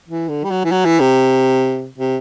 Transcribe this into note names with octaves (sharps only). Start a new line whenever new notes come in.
E3
D3
G3
F#3
E3
F#3
E3
C3
C3